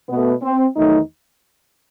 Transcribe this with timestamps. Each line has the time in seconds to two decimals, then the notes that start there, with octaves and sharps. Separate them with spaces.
0.09 B2 A3 B3
0.42 C4
0.76 E2 D#3 F#3 A3 D#4